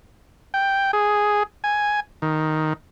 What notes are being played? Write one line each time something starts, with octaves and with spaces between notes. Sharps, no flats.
G5
G#4
G#5
D#3